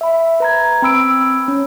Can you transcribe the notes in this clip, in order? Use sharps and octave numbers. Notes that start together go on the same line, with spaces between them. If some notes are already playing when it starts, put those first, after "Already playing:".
E5 B5
B4 A#5 G#6
C4 B5 E6 D7
C#4